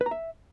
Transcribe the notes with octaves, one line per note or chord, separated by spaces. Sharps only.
B4
A#5
E5